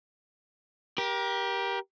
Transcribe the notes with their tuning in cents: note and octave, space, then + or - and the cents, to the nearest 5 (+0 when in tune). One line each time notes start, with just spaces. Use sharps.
G4 +0 A#4 +30